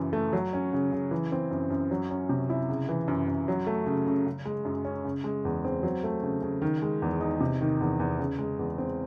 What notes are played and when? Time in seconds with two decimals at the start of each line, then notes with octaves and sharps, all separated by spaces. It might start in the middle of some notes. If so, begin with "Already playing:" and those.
Already playing: F#2 C#3 E3
0.13 A3
0.33 F#3
0.53 C#4
0.73 C#3
0.92 C#3
1.11 E3
1.32 C4
1.51 F#2
1.70 F#2
1.91 F#3
2.11 C#4
2.29 C3
2.50 E4
2.69 C#3
2.89 E3
3.08 F#2
3.28 F#2
3.48 F#3
3.67 A3
3.86 C#3
4.07 C#3
4.27 C#3
4.45 G#3
4.65 F#2
4.85 C#4
5.05 C#3
5.24 G#3
5.45 E2
5.65 C4
5.83 F#3
6.03 A3
6.23 C#3
6.42 C#3
6.62 D#3
6.82 G#3
7.02 E2
7.21 D#4
7.41 C3
7.61 D#3
7.80 E2
8.00 E2
8.19 C#3
8.39 G#3
8.59 E2
8.78 C4